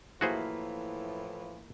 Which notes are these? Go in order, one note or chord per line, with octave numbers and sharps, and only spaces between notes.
A2 E3 F3 A#3 E4 F#4 G#4 C5